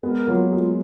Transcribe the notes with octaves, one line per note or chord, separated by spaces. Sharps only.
G#3 B3 A#4
F#3 A#3 F4
G#3 F4